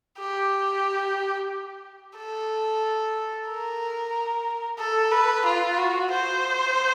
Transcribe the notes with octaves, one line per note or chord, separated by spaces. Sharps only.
G4
A4
A#4
A4
B4
F4
F#4
C5